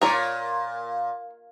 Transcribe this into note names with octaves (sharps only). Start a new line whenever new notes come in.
A#2 A#4 C#5 D5